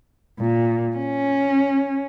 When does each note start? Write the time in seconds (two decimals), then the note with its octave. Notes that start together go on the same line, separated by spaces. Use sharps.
0.40 A#2
0.97 C#4